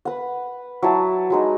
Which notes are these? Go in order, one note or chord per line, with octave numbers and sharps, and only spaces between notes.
B4 F#5
F#3 E4 A5
F#3 G#3 D#4